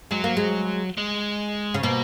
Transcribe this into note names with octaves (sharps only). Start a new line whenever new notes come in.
F#3 G#3
A#3
G#3
G#3
C#3
B2 A#3